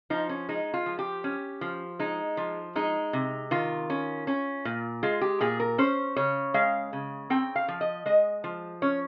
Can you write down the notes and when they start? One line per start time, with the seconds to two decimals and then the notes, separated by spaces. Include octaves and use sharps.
0.10 F3 D#4
0.29 C#4
0.49 G#3 D#4
0.74 F4
0.86 F3
0.99 G4
1.24 C#4
1.61 F3
1.99 G#3 D#4
2.37 F3
2.76 G#3 D#4
3.13 C3
3.51 D#3 F4
3.90 C#4
4.27 C#4
4.65 A#2
5.03 G#3 F4
5.21 G4
5.41 A#2 G#4
5.60 A#4
5.78 C#4 C5
6.16 C#3 C#5
6.54 G#3 F5
6.93 C#3
7.30 C4 G5
7.56 F5
7.68 F3
7.81 D#5
8.06 G#3 D#5
8.44 F3
8.82 C#4 C#5